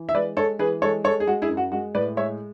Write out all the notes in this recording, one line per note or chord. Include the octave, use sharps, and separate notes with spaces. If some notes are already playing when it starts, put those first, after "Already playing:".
Already playing: E3
E5
G#3 B4 D5
G#3 A4 C#5
E3 G#4 B4
G#3 A4 C#5
G#3 A4 C#5
G#4
G#3 F#4
E4 G#4
F#2
F#4
G#3 F#4
A2 B4 D5
G#3 C#5 E5